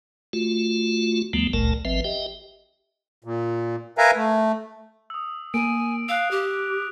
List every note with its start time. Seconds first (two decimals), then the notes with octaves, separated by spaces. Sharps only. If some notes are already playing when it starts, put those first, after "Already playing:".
0.33 A3 F4 F#4
1.33 D#2 F3 G3 A3 B3
1.53 G1 C#2 A#2 A3 A#4 A5
1.85 G#1 F3 C4 B4 E5
2.04 G4 D#5 E5 G5
3.24 A#2
3.98 A#4 B4 E5 F5 G#5 A#5
4.16 A3
5.10 D#6 E6
5.54 A#3 A#4 G#5 D7
6.09 F5 E6 F#6 F7
6.31 G4